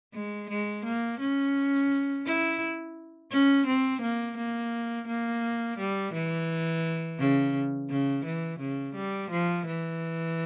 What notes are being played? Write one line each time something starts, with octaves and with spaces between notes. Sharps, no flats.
G#3
G#3
A#3
C#4
E4
C#4
C4
A#3
A#3
A#3
G3
E3
C#3
C#3
E3
C#3
G3
F3
E3